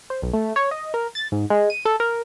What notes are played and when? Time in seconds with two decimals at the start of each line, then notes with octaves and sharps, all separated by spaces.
0.10 C5
0.22 B1
0.33 A3
0.56 C#5
0.71 D#5
0.94 A#4
1.15 A6
1.32 G#2
1.50 G#3
1.70 D#7
1.85 A4
2.00 A#4